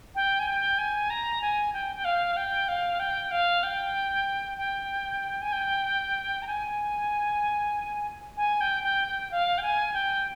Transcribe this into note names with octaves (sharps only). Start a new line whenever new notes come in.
G5
G#5
G5
G#5
A#5
G#5
G5
G5
F5
G5
F5
G5
F5
G5
G5
G#5
G5
A#5
G#5
G#5
G5
G5
G5
F5
G5
G#5
G5